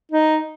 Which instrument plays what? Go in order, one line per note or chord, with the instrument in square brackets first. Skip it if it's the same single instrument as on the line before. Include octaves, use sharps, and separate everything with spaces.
[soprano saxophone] D#4